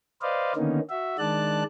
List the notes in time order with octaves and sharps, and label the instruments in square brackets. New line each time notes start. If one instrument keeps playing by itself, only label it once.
[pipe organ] B4 C5 D5 D#5 F5
D3 D#3 A#3 B3 C#4 D#4
F#4 E5
D#3 G#3 D4 D5 A5 F#6